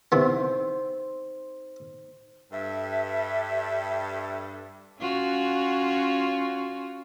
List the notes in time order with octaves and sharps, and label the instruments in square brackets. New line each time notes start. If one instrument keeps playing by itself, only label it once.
[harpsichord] C3 E3 B3 [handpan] D#4 C5
[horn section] G2 A4 [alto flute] E5
[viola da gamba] C#4 F4 F#4